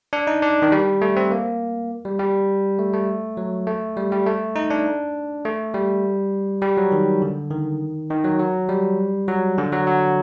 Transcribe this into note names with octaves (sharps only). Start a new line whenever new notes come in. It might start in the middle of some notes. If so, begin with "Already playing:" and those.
D4
D#4
D4
D#3
G3
A3
C4
A#3
G3
G3
A3
A3
F#3
A3
G3
G3
A3
D#4
D4
A3
G3
G3
F#3
D#3
D3
D#3
D#3
F#3
F#3
G3
F#3
D3
F#3
F#3